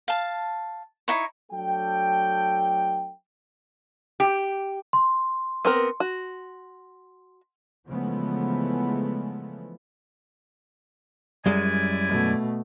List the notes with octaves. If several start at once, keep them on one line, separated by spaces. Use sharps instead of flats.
F5 A5
D#4 E4 C#5
F#3 A3 D4 A4 G5
G4
C6
B3 C4 A#4
F#4
C#3 E3 F3 G#3 A3 B3
F#2 G3 G#3 E4 D5 G#5
B2 A3